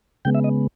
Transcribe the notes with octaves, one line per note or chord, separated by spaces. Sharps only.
C#3 G#3 B3 G5
E5
D#5